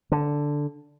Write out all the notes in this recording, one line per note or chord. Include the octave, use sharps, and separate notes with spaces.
D3